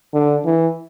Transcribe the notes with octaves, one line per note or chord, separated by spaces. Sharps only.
D3
E3